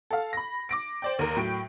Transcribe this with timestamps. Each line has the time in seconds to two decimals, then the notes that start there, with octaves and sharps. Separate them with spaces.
0.11 A4 F5
0.33 B5 A#6
0.69 D6 A#6 D7
1.02 C5 D5 G5
1.19 D#2 A#4
1.37 A2 F#3 G5 D7